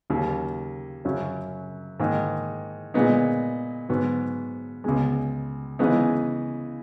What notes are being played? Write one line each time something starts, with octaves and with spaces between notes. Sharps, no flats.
D#2 C#3 F#3 A#3
F#2 C#3 F#3 C#4
G#2 D#3 A#3 D#4
A#2 G#3 B3 D#4
G#2 F#3 B3 F#4
C#2 B2 G#3
C#3 E3 G#3 B3 D#4